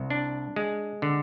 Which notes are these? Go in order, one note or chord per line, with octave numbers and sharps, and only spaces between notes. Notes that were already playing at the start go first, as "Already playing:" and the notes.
Already playing: C2
D4
G#3
D3